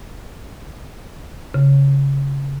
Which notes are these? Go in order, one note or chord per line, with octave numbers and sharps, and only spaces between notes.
C#3